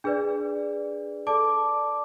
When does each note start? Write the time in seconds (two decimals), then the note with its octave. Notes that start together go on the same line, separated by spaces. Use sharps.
0.04 D4 G#4 B4 D5
1.27 A4 D5 A5 D6